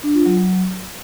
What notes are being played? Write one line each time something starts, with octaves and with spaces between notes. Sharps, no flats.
D4
F4
F#3